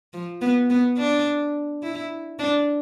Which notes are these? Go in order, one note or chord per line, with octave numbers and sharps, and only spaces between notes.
F3
B3
B3
D4
E4
D4